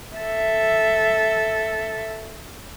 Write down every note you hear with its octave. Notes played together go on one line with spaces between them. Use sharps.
A4 E5